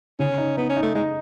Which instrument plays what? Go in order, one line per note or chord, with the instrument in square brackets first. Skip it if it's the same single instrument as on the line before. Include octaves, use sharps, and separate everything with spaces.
[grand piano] C#3 [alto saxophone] C#4
[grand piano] D#4
[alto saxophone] B3 [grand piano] D#4
[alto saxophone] C#4
[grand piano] D#4
[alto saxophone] A3
[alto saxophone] G#3 [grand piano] D#4